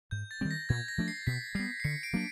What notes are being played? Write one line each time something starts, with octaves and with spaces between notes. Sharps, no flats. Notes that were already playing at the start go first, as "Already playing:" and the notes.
G#2 G6
A6
D#3 G3 C4
A#6
A#2 G#6
A#6
F3 A3 D4
C7
B2 B6
G3 B3 C7
C7
D3 B6 C#7
C7 D7
F#3 A#3 D4